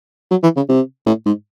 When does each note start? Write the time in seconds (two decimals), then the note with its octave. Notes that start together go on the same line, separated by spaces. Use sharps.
0.31 F#3
0.43 E3
0.56 C#3
0.69 C3
1.06 A2
1.26 G#2